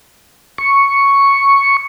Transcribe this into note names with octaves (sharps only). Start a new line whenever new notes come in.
C#6